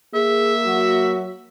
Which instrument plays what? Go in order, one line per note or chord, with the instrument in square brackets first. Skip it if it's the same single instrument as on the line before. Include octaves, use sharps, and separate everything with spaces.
[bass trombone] A#3 [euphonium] G#4 [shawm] E5
[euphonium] F#3 [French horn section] F#4